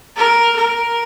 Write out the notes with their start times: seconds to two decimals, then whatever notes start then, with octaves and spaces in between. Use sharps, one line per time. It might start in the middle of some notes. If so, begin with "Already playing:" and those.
0.17 A#4
0.57 A#4